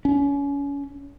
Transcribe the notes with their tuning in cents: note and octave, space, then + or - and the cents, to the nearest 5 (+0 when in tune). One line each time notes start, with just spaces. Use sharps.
C#4 +30